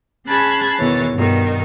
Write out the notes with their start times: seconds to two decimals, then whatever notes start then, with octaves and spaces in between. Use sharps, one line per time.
0.25 C#4 G#4 A5 B5 F#6 G#6
0.78 E2 B2 D#3 E3 C#5 A6
1.13 G2 B2 D#3